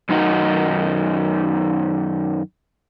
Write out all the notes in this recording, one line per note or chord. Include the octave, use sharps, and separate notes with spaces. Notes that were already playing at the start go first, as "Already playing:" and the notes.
F#2 D#3 D#4 F#4